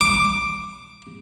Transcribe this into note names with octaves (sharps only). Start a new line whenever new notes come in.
D6